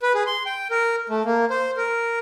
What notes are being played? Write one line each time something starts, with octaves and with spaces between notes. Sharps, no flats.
B4
G#4
C6
G5
A#4
A3
A#3
C5
A#4